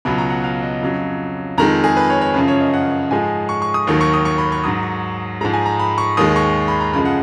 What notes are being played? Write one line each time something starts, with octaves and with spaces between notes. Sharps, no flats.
C#2 B2 F#3 B5
A#5
F#5
F5
D#5
F2 C#3 F#3
F2 D#3 G#3 A#5
G#4
B4
C#5
C#5
F#2 C#3 F3 B4
C#5
D#5
F#5
G#2 F3 G#3 G#5
C#6
C#6
D#6
D#2 D#3 F#3 C#6
C#6
D#6
C#6
B5
C#6
G#2 F#3 D#6
C#6
G#2 F3 G#3 A#5
G#5
A#5
B5
C#6
D#2 D#3 G#3 D#6
C#6
B5
A#5
F#2 C#3 F3 G#3 B5
F#5